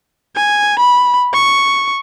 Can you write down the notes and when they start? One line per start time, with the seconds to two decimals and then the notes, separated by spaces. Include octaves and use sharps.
0.36 G#5
0.79 B5
1.34 C#6